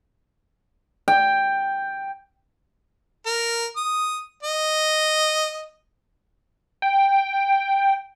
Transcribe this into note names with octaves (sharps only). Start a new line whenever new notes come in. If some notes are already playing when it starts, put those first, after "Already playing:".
G5
A#4
D#6
D#5
G5